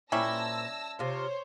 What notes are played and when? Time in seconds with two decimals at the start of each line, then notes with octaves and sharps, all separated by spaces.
0.12 A#2 G3 C#4 E4 C5 A5 E6 A#6
0.99 C3 F4 C5 C#5